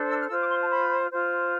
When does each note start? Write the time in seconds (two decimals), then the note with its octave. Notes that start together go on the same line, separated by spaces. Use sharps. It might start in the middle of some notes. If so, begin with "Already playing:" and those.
Already playing: D4 A4 C5
0.09 E6
0.19 F6
0.29 F4 C5 E6
0.40 D6
0.50 C6
0.60 A5
0.71 B5
1.11 F4 C5